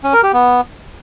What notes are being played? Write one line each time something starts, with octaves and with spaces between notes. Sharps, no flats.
C#4
A#4
G4
B3